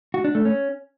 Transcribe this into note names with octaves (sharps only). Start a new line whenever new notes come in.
F#4
D4
A3
C#4